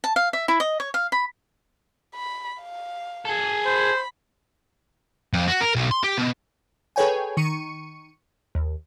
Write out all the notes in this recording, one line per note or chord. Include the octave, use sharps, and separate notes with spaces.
A5
F5
E5
E4
D#5
C#5
F5
B5
B5
F5
G#4 A4
C5 B5
F2
F#4
A#4
B1
C6
G4
B2
G#4 A4 B4 C#5 G5 G#5
D#3 C#6 C#7 D#7
D#2